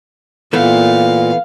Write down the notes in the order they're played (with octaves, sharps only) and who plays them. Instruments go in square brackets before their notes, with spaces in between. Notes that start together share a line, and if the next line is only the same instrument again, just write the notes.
[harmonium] A#2 [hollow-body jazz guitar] E3 A3 B3 [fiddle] F5